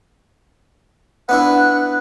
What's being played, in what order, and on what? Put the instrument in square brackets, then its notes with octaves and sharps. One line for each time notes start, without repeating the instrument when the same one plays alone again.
[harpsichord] B3 D4 E4 [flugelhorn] F#5 [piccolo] F#6